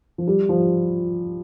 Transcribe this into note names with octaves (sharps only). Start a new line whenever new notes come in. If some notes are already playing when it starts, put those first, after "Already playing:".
F3
G3
F3